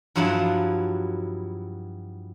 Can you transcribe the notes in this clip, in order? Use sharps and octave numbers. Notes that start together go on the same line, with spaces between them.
G2 F3 F#3 E4 F#5 A5